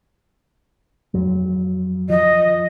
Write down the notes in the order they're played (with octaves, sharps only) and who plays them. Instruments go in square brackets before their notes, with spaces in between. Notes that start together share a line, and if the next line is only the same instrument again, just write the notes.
[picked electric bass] F2 F#3
[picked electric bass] F3 [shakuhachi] D#5